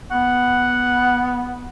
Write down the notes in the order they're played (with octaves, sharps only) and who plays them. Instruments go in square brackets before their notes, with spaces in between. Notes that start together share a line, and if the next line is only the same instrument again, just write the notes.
[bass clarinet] B3 [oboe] F#5